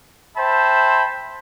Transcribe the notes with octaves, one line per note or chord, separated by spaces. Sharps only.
C5 E5 G5 A5 B5